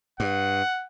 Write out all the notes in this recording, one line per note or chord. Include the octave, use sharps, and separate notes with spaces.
G2 F#5